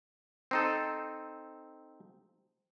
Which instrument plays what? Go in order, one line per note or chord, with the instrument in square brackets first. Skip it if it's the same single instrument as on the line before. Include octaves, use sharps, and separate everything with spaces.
[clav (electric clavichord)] C4 D#4 A4